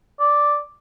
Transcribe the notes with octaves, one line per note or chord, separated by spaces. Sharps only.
D5